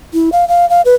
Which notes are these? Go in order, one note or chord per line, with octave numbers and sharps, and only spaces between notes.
E4
F5
F5
F5
B4